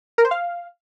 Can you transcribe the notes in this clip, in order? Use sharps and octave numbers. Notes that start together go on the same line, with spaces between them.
A#4
C5
F5